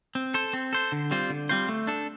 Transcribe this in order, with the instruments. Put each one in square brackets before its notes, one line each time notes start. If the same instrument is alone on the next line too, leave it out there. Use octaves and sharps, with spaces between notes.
[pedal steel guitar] C4
A4 C5
C4
A4 C5
D3
G3 C4 F4 C5
D3
G3 C4 F4 C5
A3
D4 A4